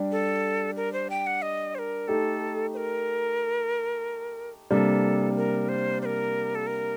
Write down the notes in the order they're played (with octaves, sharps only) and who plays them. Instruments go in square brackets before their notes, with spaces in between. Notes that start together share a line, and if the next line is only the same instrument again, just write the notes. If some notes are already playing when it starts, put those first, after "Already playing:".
Already playing: [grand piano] G3 D4 G4
[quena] A4
A#4
C5
G5
F#5
D#5
C5
A#4
[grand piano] A3 D#4 G4 [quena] A4
[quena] C5
A#4
[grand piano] C3 G3 A#3 D4 [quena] A4
[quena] A#4
C5
C5
A#4
A4
A#4